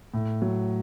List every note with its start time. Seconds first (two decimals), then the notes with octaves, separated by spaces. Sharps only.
0.14 A2
0.42 F#3